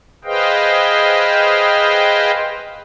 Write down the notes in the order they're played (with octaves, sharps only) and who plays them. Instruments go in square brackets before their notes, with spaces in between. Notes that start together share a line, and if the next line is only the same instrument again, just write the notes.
[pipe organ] G#4 B4 C5 D#5 F5 G5